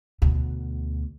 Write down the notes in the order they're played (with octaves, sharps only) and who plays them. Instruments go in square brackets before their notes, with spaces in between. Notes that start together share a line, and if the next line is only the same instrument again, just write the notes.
[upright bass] D2 B2